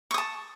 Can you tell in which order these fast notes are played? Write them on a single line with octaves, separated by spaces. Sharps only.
C#6 D#6 A5